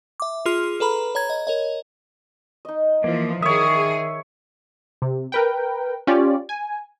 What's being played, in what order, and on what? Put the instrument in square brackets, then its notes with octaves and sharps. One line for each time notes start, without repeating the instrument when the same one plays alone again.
[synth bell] E5 D6
F4 G#4 C6 F6
A4 B4 A#5 B5
C#5 A#5 G#6
D#5
A#4 C#5 D#5
[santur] D#4 D#5
[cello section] E3 F3 [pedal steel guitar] A#3
[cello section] D#3 G#4 [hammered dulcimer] C#5 E5 [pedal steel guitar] D#6
[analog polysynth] C3
A#4 B4 G5
C#4 F4 G4 D5
G#5